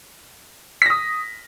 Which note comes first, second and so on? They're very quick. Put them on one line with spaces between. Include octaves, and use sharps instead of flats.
B6 A#6 D#6